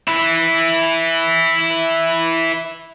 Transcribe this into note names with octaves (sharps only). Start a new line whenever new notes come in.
E4 B4